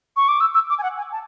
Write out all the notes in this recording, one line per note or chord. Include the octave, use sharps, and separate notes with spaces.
C#6
D6
E6
E6
D6
G#5
F#5
G#5
A5